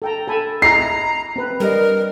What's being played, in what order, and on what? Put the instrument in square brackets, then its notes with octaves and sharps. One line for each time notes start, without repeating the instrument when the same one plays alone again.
[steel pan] A4 G5 A#5
A4 G#5 B5
[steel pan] E4 G#4 D#5 [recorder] A#5 [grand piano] C7
[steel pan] C4 B4
[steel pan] G3 D#5 [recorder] A#4